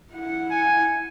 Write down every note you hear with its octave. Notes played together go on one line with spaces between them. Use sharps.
E4 F#5
G#5